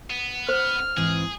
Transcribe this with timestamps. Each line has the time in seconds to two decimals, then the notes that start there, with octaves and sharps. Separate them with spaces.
0.10 B3
0.49 C5 F6
0.97 G#2 E3 C4 G#4